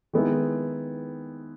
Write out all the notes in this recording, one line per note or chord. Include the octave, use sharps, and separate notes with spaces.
D#3 G#3 B3 E4